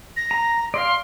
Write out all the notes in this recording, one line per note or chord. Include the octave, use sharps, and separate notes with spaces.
A#6
A#5
D5 F5 C6